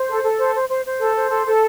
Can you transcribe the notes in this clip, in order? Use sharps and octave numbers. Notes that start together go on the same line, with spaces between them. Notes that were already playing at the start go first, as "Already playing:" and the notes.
Already playing: C5
A4
A4
C5
C5
C5
C5
A4
C5
A4
A4